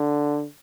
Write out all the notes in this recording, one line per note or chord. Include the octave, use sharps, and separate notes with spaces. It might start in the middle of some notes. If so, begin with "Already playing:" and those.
Already playing: D3